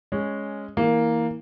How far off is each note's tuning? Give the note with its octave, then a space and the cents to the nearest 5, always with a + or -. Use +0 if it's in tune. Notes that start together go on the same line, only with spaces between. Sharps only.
G#3 -5 C#4 +0
E3 -25 A#3 +0